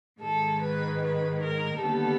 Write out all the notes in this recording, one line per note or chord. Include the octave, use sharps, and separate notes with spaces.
G#2 D#3 G#3 A4
B4
B4
A#4
D#2 D3 G3 B3 A4